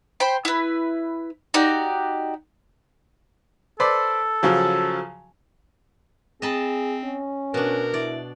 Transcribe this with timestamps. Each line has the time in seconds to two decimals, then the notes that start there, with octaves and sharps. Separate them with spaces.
0.20 C5 G5 B5
0.45 E4 B4
1.54 D#4 F#4 G4 D5
3.80 A4 B4 C5 D5
4.43 C#3 F3 F#3
6.42 C4 G#4 D#5 A5 B5
7.04 C#4
7.54 B2 D4 A#4
7.94 E4 D5